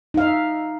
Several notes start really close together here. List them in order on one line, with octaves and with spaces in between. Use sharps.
D#4 F5 E5